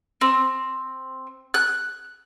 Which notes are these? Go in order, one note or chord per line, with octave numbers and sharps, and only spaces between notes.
C4
F#6